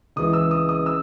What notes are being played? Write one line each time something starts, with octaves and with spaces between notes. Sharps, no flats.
C#2 C#3 E3 D#6
E6
D#6
D#6
E6